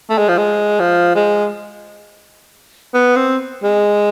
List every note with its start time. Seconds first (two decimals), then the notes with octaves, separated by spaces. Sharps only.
0.10 A3
0.18 G#3
0.28 F3
0.38 G#3
0.80 F3
1.15 G#3
2.94 B3
3.16 C4
3.63 G#3